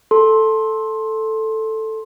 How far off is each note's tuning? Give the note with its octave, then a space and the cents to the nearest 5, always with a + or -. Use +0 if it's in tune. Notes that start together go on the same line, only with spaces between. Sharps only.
A4 +0 C6 +15